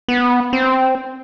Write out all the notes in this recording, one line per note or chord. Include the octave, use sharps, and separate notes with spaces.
B3
C4